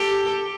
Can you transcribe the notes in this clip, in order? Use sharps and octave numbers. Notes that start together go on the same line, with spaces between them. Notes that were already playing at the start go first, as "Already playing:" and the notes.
Already playing: G4 A4